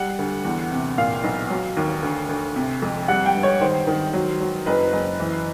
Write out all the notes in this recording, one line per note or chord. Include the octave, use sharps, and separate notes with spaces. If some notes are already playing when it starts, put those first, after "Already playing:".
Already playing: G3 F#5
D2
E2
C3
A#2 F5
B1
F#3
D#2
D2
D2
C3
F2
G3 F#5
G5
G1
C#5
D#3 C5
D#3
F#3
F#3
F#1 B4
F#1
E3